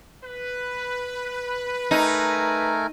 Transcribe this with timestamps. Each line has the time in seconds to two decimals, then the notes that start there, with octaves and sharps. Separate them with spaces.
0.25 B4
1.91 A3 D#4 A#4 G#5